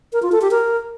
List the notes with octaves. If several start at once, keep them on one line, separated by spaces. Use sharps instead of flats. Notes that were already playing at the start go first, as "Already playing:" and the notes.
A#4
F4
A4
G4
A#4